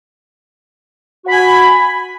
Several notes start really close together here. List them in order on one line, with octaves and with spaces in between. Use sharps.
F#4 B5 G#5